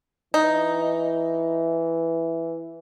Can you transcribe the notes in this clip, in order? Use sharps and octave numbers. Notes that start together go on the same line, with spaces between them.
E3 D#4